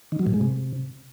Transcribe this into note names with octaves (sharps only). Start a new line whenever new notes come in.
D#3
F#3
A2
G#3
C3